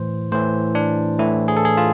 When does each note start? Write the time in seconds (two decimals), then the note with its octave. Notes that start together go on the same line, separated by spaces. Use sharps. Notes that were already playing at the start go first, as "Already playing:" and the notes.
Already playing: A2 E3 C5
0.32 A2 E3 C5
0.75 D4
1.19 A2 E3 E4
1.48 G#4
1.57 A4
1.65 G#4
1.77 F4